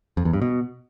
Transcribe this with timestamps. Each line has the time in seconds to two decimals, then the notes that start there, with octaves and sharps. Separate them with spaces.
0.17 F2
0.25 E2
0.33 G2
0.42 B2